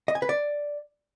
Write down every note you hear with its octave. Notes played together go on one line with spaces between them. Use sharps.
D#5
G#5
B4
D5